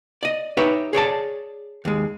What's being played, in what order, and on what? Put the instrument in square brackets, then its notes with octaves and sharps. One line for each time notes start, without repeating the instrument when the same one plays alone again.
[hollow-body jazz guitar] D5 D#5
D#4 G4 B4 C#5 E5
G#4 C#5 D5 A5
D#2 G#3